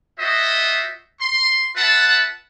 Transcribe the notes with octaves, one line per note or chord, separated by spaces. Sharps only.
F4 F#4 C5 D#5 E5
C6
F4 B4 E5 F#5 A5